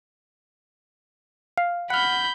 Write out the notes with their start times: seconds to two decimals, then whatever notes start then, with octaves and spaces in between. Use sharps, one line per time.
1.57 F5
1.90 F#5 B5 F6 G6